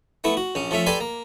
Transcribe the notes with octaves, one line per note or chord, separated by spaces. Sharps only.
A3 B3 E4
F#4
A#1 C#4
F3 A3 C#4 E5
G4 A4 B4 D5 G#5 C6
A#3